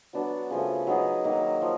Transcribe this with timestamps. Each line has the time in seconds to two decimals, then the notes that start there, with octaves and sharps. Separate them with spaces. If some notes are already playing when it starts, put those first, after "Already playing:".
0.13 F#3 B3 D4 F#4
0.50 C#3 F3 A3
0.87 F#3 B3 D#4 G#4
1.24 D#3 F#3 A#3
1.62 F3